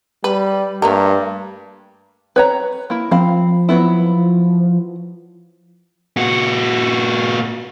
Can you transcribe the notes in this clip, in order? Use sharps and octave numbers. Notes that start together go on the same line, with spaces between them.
G3 B4
G2 A3 A#3 A#4
B4 C#5 A#5
A#3 E4
F3 C4 F5 B5
F#3 B3 E4
A#2 F#4